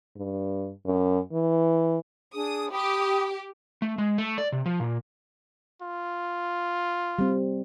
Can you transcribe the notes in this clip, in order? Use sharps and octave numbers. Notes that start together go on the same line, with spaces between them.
G2
F#2
E3
D4 G#4 D#6
G4 B5 D6 D#6
A3
G#3
A3
D5
C3
F3
A#2
F4
G3 C4